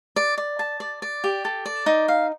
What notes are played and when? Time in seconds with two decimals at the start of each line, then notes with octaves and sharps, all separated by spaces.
0.16 D5
0.38 D5
0.59 A5
0.80 D5
1.02 D5
1.24 G4
1.45 A4
1.66 D5
1.86 D#4
2.08 F5